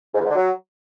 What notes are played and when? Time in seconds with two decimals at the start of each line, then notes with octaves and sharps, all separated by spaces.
0.14 G#2
0.20 E2
0.25 G#2
0.30 D3
0.35 F#3